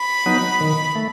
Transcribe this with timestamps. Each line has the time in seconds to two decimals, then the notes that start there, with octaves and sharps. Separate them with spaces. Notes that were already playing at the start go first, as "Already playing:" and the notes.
Already playing: B5
0.26 F#3 B3 D#4
0.61 D#3
0.95 A3